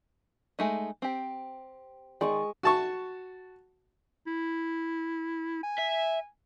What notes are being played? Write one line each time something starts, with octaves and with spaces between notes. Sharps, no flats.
G#3 A3 D#4
C4 G4
D#3 G#3 D5 C#6 D#6
F#4 A5 C#6
E4
G#5
E5